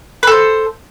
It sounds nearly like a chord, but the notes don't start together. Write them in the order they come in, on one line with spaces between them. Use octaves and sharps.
B4 A4 C5